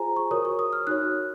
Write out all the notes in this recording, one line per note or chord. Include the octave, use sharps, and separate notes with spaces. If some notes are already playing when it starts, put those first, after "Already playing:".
Already playing: F4 G#4 C5 G#5 A#5
C#6
F#4 A#4 C#5 D#6
C#6
D#6
F6
D#4 F#4 C#5 F#6